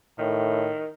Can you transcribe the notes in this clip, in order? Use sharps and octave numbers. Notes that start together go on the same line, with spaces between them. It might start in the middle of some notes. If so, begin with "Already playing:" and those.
A2 D#3